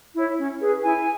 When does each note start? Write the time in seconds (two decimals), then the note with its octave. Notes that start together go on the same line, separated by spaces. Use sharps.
0.15 E4 C#5
0.37 C#4
0.60 G#4 B4
0.83 E4 G#5